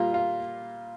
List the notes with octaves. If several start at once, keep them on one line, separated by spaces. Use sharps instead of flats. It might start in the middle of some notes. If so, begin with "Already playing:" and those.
Already playing: A#2 G3 A#3 F4
F4